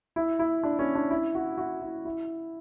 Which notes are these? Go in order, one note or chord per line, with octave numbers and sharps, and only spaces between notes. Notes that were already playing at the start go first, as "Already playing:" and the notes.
E4
E4
D4
C#4
D4
E4
F#4
F#4
E4
E4